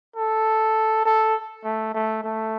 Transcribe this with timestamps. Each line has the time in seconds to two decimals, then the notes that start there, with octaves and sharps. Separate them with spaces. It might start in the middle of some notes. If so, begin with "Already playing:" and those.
0.16 A4
1.05 A4
1.65 A3
1.95 A3
2.24 A3